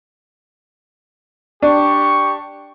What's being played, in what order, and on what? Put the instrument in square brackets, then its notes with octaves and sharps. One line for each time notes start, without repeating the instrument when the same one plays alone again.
[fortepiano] D4 [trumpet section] G4 C#6